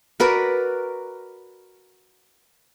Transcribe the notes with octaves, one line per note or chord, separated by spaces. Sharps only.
F#4 A#4 B4 D5